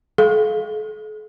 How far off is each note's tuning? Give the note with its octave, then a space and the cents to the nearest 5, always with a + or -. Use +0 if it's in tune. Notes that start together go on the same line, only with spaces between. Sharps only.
A4 -45 F5 +0